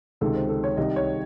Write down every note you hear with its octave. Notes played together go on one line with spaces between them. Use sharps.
C#2 C3 D#3 A4
C5
A4
C#5
C2 C3 D#3 D#5
C#5